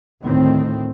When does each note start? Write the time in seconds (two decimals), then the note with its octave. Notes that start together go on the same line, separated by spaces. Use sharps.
0.24 D2 A2 D#3 C4